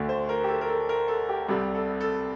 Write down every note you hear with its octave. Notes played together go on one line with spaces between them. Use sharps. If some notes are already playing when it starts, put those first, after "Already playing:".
Already playing: D2 D3 A3
C5
A#4
G4
A4
A#4
A4
A#4
A4
G4
C2 C3 G3 A4
A4
A4